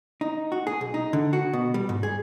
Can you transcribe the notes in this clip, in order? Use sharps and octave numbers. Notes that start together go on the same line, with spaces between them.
D#4
F#4
G#4
B1
D#4
D3
F#4
B2
G3
G#2
G#4